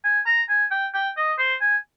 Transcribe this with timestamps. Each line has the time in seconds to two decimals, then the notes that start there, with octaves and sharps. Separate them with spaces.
0.05 G#5
0.26 A#5
0.49 G#5
0.71 G5
0.94 G5
1.17 D#5
1.39 C5
1.61 G#5